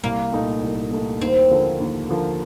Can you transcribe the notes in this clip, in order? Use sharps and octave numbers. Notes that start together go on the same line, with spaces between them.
C2 A#3
A#2 A3 D#4
C2
A#2 A3 D#4
D#2 C4
D3 F3 A#3
D#2
D3 F3 A#3